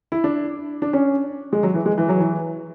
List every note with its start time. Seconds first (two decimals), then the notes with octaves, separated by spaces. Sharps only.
0.12 E4
0.24 D4
0.82 D4
0.93 C#4
1.53 G#3
1.63 F#3
1.74 E3
1.86 G#3
1.98 E3
2.09 F#3
2.20 E3